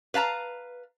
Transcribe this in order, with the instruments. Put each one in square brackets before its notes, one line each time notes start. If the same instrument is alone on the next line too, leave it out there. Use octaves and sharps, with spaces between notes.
[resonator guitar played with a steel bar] B4 F5 A5 A#5